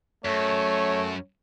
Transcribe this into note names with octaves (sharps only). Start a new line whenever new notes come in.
F#2 A3 C#5